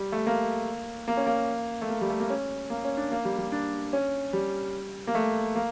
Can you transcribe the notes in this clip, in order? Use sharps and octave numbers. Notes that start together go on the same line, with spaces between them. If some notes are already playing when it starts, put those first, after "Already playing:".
Already playing: G3
A3
A#3
A#3
C#4
A#3
A3
A#3
G3
A3
A#3
C#4
A#3
C#4
D4
A#3
G3
G3
D4
C#4
G3
A#3
A3
A#3